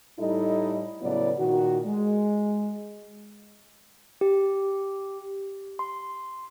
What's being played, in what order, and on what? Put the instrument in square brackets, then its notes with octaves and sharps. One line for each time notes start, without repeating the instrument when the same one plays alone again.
[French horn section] A2 G3 D#4 E4 A4 D#5
A2 C#3 F#3 B3 E4 D5
A#2 D#3 F#4
G#3
[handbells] G4
C6